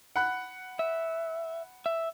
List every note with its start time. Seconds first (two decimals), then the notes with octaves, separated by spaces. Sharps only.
0.16 F#5 B5 F#6
0.79 E5
1.86 E5